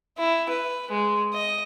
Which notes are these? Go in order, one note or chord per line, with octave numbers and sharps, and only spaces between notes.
E4
B4
G#3
D#5